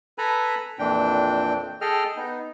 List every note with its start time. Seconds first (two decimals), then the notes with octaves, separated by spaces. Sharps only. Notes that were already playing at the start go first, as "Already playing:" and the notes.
0.18 A4 B4 G#5 A#5 B5
0.79 F2 A#2 E3 D4 G5
1.81 G#4 A4 D#5 G5 F6
2.17 B3 D#4